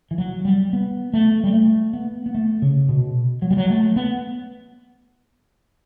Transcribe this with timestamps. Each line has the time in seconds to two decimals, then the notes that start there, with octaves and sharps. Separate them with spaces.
0.11 E3
0.18 F#3
0.45 G3
0.73 B3
1.13 A3
1.44 G3
1.53 A3
1.93 B3
2.26 B3
2.34 A3
2.62 C#3
2.89 B2
3.42 F#3
3.51 G3
3.57 F#3
3.70 A3
3.96 B3